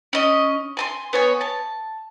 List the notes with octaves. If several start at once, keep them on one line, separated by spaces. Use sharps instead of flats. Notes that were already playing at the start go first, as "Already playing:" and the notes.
C#4 D#5
G#5 A5 C6
B3 C#5 G#5
A5